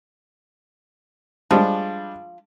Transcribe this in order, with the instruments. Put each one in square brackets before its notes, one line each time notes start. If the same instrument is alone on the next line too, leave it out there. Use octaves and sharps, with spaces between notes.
[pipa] F3 [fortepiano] G3 G#3 D4